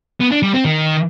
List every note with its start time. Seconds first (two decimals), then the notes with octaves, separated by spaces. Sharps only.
0.20 B3
0.31 D4
0.43 G3
0.54 C4
0.65 D#3